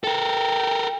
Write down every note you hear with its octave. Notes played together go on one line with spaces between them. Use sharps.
A4 A#4 G5